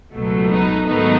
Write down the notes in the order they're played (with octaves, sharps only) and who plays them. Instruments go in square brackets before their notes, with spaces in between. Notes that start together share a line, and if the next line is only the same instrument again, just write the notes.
[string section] C#2 B2 F#3 A3
B3 D#4
G#2 D#3 F#3 A3 B3 D#4